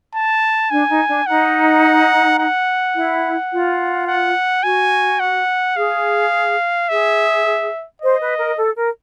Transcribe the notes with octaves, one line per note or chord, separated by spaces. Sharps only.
A5
D4 G#5
D#4
D4
D#4 F#5
F#5
E4
F4
F#5
F#4 G#5
F#5
G#4 F5
G#4 E5
C5 D#5
B4
A#4
A4
A#4